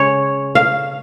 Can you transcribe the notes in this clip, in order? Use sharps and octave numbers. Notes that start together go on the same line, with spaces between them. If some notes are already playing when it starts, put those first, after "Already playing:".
Already playing: C#3 G#3 C#4 C#5
F5